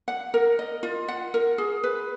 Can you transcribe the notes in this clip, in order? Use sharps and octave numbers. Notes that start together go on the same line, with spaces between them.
F#5
A#4
D#5
F4
F#5
A#4
G#4
B4